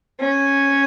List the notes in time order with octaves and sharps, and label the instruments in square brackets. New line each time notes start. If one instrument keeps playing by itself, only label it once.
[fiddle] C#4